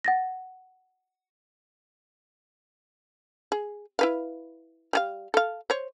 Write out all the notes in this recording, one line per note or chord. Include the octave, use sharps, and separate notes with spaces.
F#5 A6 A#6
G#4
E4 B4 F5
G3 G#4 F5
A4 F5
C5 C#5